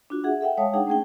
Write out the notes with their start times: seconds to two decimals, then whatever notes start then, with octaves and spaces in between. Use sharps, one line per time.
0.10 D4 F4 F#4
0.24 G#4 E5 F#5
0.41 A4 E5 F#5 G5
0.57 G#3 C#5 F5 G5 A5 D#6
0.74 D4 D#4 G#4 F#5 G5
0.87 A3 C#4 G#4 G5